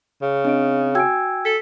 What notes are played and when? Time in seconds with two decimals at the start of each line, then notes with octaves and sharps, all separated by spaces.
0.22 C#3
0.45 C4 D4 D#5 D7
0.95 F#4 G5 G#5 E6 G#6 D7
1.45 A4 B6